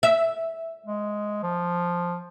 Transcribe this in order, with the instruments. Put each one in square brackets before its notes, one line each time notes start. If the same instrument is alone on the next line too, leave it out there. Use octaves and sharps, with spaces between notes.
[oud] E5
[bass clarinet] G#3
F3